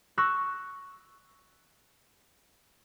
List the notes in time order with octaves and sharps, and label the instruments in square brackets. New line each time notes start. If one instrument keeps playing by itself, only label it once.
[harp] C#6 E6 F#6 A#6 C#7